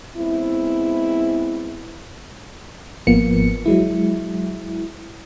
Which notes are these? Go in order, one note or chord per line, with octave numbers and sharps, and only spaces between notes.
G#3 B3 C4 E4
G#1 F3 A#3 B3 C#7
F#3 G#3 E4